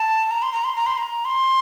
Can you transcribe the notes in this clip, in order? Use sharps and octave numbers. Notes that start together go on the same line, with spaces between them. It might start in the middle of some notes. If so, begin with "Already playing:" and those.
Already playing: A5
A#5
C6
A#5
C6
A#5
C6
A#5
C6